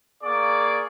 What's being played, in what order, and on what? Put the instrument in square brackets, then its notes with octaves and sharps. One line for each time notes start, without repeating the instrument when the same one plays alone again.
[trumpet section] A#3 G#4 D5 C#6 D6